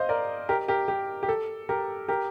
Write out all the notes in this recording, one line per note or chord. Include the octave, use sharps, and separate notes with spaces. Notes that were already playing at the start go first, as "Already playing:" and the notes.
Already playing: C5 D#5 F5
A#4 D5
G4 A#4
G4 A#4
G4
G4
A4
G4 A#4
G4 A#4